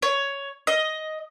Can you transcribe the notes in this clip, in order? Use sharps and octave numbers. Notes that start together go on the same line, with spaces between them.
C#5
D#5